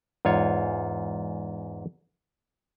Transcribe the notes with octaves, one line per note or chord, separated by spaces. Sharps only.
E2 G#2 F4 C#5